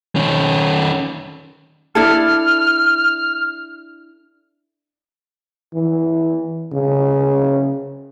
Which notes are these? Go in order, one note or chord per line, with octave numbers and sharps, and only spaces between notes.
D#3 C#4
D4 E4 A4 F6
E3
C#3